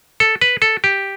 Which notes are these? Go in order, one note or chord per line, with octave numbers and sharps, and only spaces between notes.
A4
B4
A4
G4